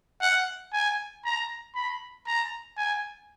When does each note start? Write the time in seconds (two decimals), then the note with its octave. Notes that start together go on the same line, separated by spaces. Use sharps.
0.21 F#5
0.73 G#5
1.25 A#5
1.75 B5
2.27 A#5
2.77 G#5